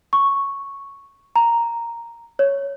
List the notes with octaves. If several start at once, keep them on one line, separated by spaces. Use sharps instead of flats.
C#6
A#5
C#5